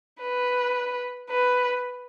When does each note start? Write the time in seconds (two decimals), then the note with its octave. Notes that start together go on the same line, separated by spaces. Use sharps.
0.22 B4
1.30 B4